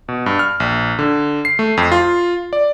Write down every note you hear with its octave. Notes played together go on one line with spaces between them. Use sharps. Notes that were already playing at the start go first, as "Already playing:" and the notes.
B2
G2
F6
A#1
D3
C7
A3
F2
F4
D5